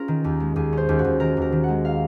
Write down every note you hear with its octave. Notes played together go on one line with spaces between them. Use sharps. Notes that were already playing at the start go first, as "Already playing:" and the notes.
Already playing: C#4 F4 G#4 A#4
D#3
D#2
G#3
D#2 G#4
C#4 C5
D#2
F#4
D#2
D#3 A#4
D#2 A#4
D#3
G#3 F#5
F5